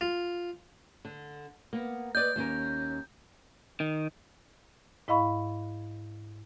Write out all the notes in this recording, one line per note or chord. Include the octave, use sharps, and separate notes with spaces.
F4
D3
A#3 B3
B4 D5 D#5 G6
D#2 C#4 A#4
D#3
G#2 E4 D#5 F5 B5 C#6